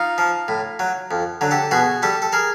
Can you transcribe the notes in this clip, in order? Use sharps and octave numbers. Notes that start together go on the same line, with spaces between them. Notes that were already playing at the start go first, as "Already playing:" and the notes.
Already playing: D#4 F4
F3
A2
F#3
F2
D3 F#3
G4 A4
B2 F#4 G#4
G3 G4 A4
A4
G#4 A#4